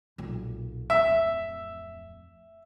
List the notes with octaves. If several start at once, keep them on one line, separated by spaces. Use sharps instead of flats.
B1 A#2
D1 F2 E5